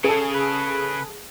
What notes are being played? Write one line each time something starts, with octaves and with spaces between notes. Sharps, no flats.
C#3 G#4 A4
B4